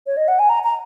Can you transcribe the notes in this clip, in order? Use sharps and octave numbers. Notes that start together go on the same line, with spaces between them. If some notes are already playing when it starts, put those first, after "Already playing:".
C#5
D#5
F#5
G#5
A#5
A#5